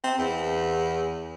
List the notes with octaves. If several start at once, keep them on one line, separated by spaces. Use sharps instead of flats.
C4
E2